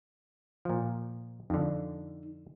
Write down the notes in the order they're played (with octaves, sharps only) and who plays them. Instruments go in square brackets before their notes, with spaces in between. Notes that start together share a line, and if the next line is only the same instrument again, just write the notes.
[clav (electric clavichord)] A#2 F3
[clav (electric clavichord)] F2 D3 [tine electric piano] D#4